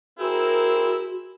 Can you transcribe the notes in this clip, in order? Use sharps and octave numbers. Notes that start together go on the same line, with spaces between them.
C4 E4 F#4 G#4 A#4